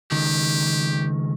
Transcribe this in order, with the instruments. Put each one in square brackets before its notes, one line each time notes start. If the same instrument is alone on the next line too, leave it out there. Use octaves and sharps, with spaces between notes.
[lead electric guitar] C#2 D#3 [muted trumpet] G4